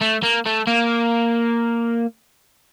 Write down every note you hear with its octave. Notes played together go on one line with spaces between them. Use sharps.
A3
A#3
A3
A#3